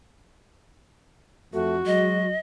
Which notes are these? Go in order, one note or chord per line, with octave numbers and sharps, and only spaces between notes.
F2 A3 F#4
F#3 G#3 D#5